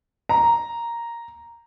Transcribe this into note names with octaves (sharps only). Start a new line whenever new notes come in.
A#5